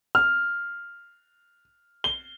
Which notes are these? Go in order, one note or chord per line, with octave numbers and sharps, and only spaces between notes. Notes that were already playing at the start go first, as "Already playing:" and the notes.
F6
G7